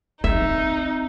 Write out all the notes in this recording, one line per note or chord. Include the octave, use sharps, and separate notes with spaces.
C4 D#4 E5